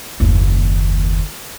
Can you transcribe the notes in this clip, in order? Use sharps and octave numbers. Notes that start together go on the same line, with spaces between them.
F#1 D#2